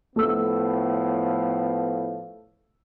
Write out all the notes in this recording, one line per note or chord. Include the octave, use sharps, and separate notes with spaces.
A2 F3 A3 B3 E6